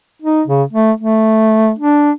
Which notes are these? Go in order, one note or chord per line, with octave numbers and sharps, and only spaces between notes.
D#4
C#3
A3
A3
D4